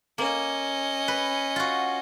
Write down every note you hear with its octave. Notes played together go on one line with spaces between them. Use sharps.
A#3 C#4 D#5
B4
F4 F#4